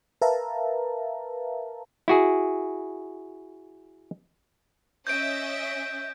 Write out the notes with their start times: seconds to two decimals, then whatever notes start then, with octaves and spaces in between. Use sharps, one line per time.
0.21 A#4 B4 E5 F5 A5 A#5
2.08 E4 F#4 G#4
5.07 C#4 D#5 E5 G6 D7